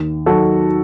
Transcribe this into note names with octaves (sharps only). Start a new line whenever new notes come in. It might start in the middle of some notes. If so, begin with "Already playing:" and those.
Already playing: D#2
D#3 F#3 F#4 A4